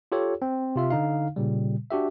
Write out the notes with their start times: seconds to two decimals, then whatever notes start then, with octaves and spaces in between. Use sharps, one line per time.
0.12 F4 G4 A4 C#5
0.42 C4
0.76 C3 F4 E5
0.90 D3 D#4 F5
1.36 A#2 C#3 G3
1.91 D4 F#4 G4 E5